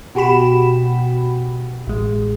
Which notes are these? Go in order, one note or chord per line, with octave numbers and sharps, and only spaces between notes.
B2 F#4 G4 B5 E7
A1 G#3